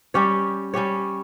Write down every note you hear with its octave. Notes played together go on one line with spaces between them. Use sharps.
G3 C#4 G4 C#5
G3 C#4 G4 C#5